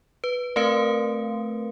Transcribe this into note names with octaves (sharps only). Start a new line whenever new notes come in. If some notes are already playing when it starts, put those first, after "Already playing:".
B4
A3 C4 A#4 B4 F5